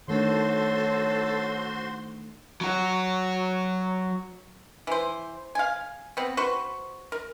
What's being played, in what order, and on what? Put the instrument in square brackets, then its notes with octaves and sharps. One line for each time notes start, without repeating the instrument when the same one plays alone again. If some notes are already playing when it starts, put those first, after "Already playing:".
[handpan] D#3 A3 D4 [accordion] F#4 C5 C6 [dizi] A4 [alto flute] C#5
[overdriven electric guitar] F#3 F#4
[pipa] E3 C5
F5 G#5
B3 C4
F#4 B4 C5 C#6
A#4